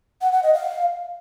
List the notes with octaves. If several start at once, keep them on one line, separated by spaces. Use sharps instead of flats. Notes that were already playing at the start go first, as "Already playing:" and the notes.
F#5
F#5
D#5
F5